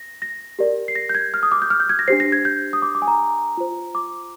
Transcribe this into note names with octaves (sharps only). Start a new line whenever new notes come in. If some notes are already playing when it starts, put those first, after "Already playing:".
Already playing: A#6
A#6
G4 A#4 D5
C7
A#6
G6
G#6
F6
D#6
D6
G6
F6
G6
G#6
A#6
D4 G4 C5 C7
A#6
G#6
G6
D#6
D6
D6
G#5
A#5
F4 C5
D6